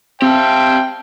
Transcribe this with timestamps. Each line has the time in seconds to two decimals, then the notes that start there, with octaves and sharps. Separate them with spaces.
0.22 C4 G4 C5 E5 F5 G5 A5